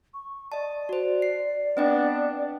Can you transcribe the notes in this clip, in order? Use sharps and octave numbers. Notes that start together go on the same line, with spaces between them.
C#6
D5 D#5 A5
F#4 C5
C7
B3 C4 D4 D#5 G5